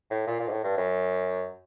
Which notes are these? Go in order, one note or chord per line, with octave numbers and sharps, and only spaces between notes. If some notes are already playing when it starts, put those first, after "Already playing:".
A2
A#2
A#2
G#2
A2
G2
F#2